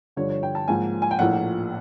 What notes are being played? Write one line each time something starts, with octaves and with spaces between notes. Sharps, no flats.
G2 D3 F3 C#5
C#5
G5
A5
G#2 F3 A#3 G#5
G#5
G5
A#1 A2 F3 A#3 F#5